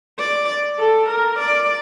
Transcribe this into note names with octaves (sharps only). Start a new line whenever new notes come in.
D5
A4
A#4
D5